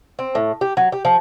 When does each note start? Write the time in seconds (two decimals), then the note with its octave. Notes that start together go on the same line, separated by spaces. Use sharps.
0.19 C4
0.35 A2
0.61 G4
0.77 F#3
0.92 G4
1.05 F3